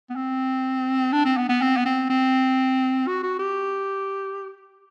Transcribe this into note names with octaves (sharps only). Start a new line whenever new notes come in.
B3
C4
D4
C4
B3
B3
C4
B3
C4
C4
F#4
F#4
G4